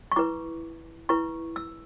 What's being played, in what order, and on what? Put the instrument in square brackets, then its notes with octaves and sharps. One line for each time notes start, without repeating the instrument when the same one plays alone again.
[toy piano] C#6
E4 B4 D6
E4 B4 C#6
E6